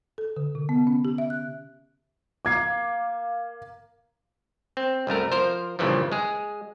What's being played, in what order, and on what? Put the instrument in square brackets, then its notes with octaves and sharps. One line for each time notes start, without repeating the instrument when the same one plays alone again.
[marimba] A4
D3
C3
B3
C#4
G4
E5
F#6
[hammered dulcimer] A#3 F5 [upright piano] D6 G#6 C7
[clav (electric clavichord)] C4
C2 F#2 A3 A#4
F3 A#4 C5
G2 A#2 C#3 E3 F3
G#3 G#4